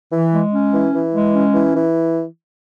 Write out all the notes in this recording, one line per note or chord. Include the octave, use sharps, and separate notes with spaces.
E3
G#3
C#4
E3
E3
G#3
C#4
E3
E3